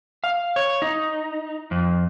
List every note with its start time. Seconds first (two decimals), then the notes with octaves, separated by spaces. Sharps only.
0.24 F5
0.56 C#5
0.82 D#4
1.71 F2